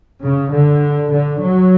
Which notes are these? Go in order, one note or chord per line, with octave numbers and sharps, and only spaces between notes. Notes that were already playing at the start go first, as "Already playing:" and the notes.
C#3
D3
D3
F#3